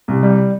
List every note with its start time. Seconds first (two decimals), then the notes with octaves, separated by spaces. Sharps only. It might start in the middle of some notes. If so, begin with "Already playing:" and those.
0.08 C2
0.23 G3